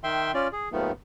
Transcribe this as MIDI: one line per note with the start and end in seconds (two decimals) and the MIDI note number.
0.04 0.32 51
0.04 0.32 76
0.04 0.32 79
0.04 0.32 84
0.34 0.48 61
0.34 0.48 65
0.34 0.48 74
0.53 0.69 68
0.72 0.92 39
0.72 0.92 44
0.72 0.92 51
0.72 0.92 53
0.72 0.92 57
0.72 0.92 59